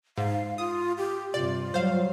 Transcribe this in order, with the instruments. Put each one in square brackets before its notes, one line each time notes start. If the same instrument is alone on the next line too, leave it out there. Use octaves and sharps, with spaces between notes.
[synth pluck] G#2 [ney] F5
[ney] F4 [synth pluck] D#6
[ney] G4
[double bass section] G2 C3 [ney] F4 [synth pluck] D5
[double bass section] F#3 G3 [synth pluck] C5 F5